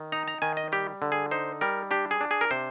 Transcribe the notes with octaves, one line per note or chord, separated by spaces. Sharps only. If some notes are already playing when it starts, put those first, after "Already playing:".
Already playing: D#3
D#4 A#5
A#5
D#3 G#5
D#5
G3 G4
D3
G#4
D#4 C5
G3 A#4
D4 G4
G#4
D4
G#4
A#4
C3 C5